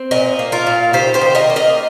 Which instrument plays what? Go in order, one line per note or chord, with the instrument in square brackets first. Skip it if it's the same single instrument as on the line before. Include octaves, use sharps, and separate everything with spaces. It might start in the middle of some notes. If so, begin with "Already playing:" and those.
Already playing: [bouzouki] C4
A#2 A#4 D#5
A#3
F4 A#4
A#2
D#3 G4 C5
G4 C5
D#3
A#4 D#5
A#3
A#4 D#5